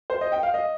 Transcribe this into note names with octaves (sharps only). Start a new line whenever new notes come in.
C5
D#5
G5
F5
D#5